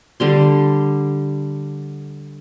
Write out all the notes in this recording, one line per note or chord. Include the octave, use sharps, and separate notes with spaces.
D3 G3 C6